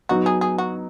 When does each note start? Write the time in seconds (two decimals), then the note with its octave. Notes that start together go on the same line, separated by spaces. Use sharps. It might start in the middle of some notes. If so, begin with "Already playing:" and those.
0.09 F#3 B3 D#4 F#4
0.26 G#4
0.41 G#4
0.58 F#4